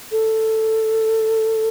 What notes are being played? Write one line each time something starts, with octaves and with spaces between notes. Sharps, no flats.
A4